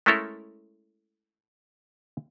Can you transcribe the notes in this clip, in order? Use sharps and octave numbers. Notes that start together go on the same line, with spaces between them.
G#3 A3 C#4 E4 A4 A#4